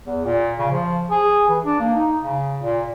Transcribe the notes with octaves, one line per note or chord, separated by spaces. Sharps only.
E2
A#2
C#3
F3
G#4
E3
D4
A#3
D#4
C#3
A#2